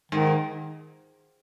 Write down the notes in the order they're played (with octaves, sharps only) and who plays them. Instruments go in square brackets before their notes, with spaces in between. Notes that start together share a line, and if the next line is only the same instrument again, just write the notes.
[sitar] G#2 [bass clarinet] D#3